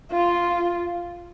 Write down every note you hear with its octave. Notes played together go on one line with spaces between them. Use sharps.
F4